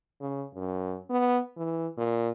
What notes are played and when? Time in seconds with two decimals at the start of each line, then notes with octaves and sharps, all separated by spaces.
0.21 C#3
0.55 F#2
1.10 B3
1.57 E3
1.97 A#2